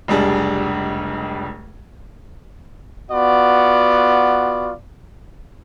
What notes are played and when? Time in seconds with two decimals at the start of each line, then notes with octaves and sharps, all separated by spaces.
0.08 F1 C#2 G3 D4 G#4
3.11 B3 F4 F#4 D5